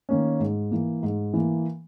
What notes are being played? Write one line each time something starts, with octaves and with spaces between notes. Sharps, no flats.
D#3 A#3 C#4
G#2
E3 A#3
G#2
E3 A#3